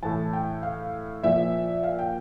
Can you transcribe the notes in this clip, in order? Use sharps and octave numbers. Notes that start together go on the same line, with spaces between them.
A2 E3 A5
G5
F5
A#2 F3 E5
F5
G5